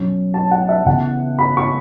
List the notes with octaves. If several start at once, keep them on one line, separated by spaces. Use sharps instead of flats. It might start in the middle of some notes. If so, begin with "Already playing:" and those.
Already playing: B2 F#3 C#4
A5
F#5
E5
C#3 E3 B3 F#5
B5
C#6